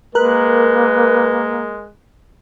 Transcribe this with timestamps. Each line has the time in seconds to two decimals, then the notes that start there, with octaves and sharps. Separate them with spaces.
0.15 G#3 A#3 A#4 B4 F#6